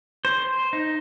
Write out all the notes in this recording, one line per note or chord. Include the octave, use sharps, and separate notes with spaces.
C5
C5
D#4